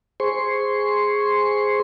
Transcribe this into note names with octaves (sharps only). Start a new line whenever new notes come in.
G#4 C5 C6 C#6